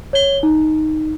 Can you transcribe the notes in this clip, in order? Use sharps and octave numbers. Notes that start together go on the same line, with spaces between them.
C#5 G7
D#4